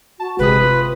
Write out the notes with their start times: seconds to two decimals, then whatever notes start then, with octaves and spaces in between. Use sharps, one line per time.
0.20 F#4 A5
0.39 G1 C3 G#3 B4 D#6
0.60 F4